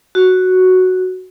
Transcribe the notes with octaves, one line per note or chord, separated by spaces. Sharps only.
F#4